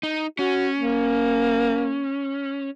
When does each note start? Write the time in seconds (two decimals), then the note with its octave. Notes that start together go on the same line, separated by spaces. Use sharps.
0.03 D#4
0.39 C#4 F#4
0.77 A#3